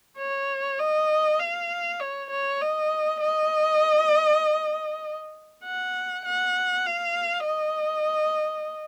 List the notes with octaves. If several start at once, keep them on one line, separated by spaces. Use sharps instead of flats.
C#5
D#5
F5
C#5
C#5
D#5
D#5
F#5
F#5
F5
D#5